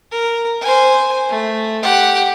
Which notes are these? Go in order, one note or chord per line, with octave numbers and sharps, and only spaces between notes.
A#4
C5 G#5
A3
G4 F#5